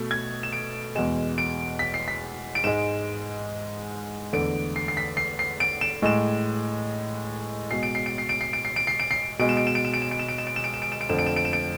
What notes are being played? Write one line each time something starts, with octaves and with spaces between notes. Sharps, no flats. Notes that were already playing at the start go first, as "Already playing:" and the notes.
Already playing: B2 A3
G#6
E7
D7
E2 B2 G#3 E7
D7
B6
C7
B6
D7
G#2 G#3 E7
E2 D3 A3 D7
C7
C7
B6
C7
C7
D7
E7
A2 G#3 E7
B2 G#3 C7
D7
C7
D7
C7
D7
C7
D7
C7
D7
C7
D7
C7
B2 G#3 D7
E7
D7
E7
D7
E7
D7
E7
D7
E7
D7
E7
D7
E7
D7
E7
D7
E7
D7
F2 D3 A3 E7
D7
E7
D7
E7
D7